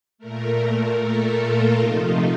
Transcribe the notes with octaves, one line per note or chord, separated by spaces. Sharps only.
A#2 A3 A#4
A4
F4
C3 F3 A3 D#4